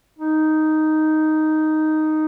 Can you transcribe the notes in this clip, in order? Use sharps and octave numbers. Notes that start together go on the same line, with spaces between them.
D#4